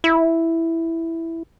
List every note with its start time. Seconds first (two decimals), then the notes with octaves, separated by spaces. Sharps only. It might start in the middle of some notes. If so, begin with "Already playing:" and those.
0.04 E4